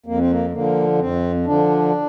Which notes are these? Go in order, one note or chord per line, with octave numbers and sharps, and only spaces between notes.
F2 A#3
C4
A#3
D3 F3 A#3
F2 C4
D3 F3 D4